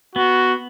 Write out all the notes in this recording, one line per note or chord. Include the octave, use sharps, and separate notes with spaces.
B3 F#4